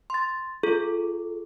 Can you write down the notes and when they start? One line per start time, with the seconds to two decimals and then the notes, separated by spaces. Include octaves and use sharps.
0.10 C6 A6
0.63 F4 G#4 A4